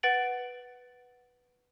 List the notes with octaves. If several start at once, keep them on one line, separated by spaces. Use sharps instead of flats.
B4 F#5 A6 D7 F#7